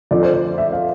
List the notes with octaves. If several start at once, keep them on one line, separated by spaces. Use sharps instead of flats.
F2 D3 F3 D5
C5
C5
E5
F5